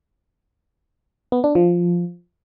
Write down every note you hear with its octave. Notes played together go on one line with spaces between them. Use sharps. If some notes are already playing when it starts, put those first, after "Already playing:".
B3
D4
F3